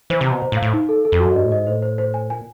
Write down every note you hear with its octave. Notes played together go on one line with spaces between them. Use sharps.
E3 C5
C3
B2 A#5
C5
A2
F5
A2
D#4
A4
A4
F2
F#2 F#4
G2 D#5
A2
G#2 D#5
A2 C5
C5
C5
G#5
A#2 G#5